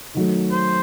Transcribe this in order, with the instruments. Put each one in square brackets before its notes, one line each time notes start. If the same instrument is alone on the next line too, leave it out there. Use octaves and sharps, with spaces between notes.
[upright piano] D#3 F#3 A3
[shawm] C5